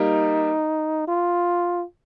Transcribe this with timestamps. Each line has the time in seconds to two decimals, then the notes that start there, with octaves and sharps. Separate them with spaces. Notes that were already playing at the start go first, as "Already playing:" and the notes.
Already playing: G3 A#3 D#4
1.08 F4